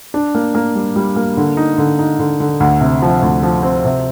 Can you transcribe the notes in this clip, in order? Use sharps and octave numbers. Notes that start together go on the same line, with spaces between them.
D4
A#3
A#3
G3
G3
A#3
D3
D#4
D3
D#4
D3
D3
D2
C3
F3
D2
F3
C4
C3